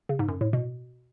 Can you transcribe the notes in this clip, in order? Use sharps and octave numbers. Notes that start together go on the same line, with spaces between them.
C#3
G#2
F#2
A2
B2